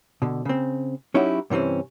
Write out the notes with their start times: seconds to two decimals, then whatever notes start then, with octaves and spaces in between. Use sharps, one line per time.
0.22 B2 D3
0.45 C#3 C4
1.14 F#3 C#4 D#4 E4 F#4 G4
1.50 G2 C3 E3 C4 C#4